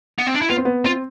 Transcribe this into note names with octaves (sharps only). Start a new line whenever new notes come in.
B3
C4
D4
E4
B3 F4
C4
B3
C4 F4